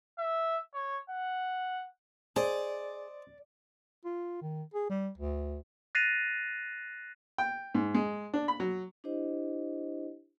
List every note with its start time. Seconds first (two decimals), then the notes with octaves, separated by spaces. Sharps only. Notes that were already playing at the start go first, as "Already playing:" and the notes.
0.19 E5
0.74 C#5
1.10 F#5
2.36 G#4 C5 D5 D#5
4.05 F4
4.42 D#3
4.74 G#4
4.90 G3
5.18 D2
5.95 F#6 A6 A#6 C7 D#7 F7
7.38 G5
7.75 G#2
7.95 G#3
8.34 D4
8.48 B5
8.60 F#3
9.04 D4 E4 G4 C5 D#5